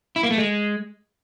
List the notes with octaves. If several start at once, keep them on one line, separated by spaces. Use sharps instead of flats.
E4
A#3
A3
G#3